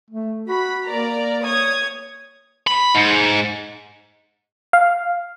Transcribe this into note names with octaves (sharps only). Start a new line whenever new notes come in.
A3
F#4 B5
A#3 A#4 D5 A#5
C#5 D#6 G#6
B5
G#2
F5